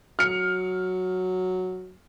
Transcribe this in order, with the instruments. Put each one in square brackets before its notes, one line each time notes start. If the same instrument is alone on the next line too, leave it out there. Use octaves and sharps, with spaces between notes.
[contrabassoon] F#3 [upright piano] F6 C#7